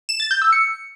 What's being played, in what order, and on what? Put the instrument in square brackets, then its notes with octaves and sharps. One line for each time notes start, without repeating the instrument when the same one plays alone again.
[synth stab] E7
A6
G6
E6
C#7